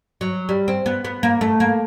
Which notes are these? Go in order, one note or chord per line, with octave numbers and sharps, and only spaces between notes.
F#3
G3
C4
B3
B3
A#3
A3
A#3